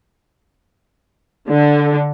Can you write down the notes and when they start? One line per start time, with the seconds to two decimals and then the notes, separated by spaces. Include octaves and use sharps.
1.48 D3